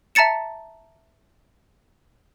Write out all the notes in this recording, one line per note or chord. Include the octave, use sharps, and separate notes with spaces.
E5 A5 A#5 A6 C#7 E7